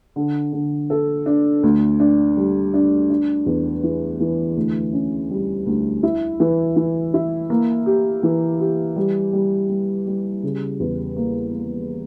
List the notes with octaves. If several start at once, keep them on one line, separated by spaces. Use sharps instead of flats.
D3
D3
A4
D4
D2
D4
G3
D4
D4
E2
E3
E3
D2
C#4
G3
D2
E4
E3
E3
E4
A#3
G4
E3
G4
G3
G3
G3
G3
C#3
E2
A#3
A#3